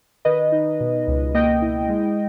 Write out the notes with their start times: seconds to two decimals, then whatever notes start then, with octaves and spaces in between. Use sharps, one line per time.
0.25 D#3 B4 D#5
0.52 D#4
0.80 B2
1.07 C#2
1.34 A#3 D#5 G5
1.62 E4
1.89 G#3